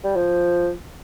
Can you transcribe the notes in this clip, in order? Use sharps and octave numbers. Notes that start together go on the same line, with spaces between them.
G3
F3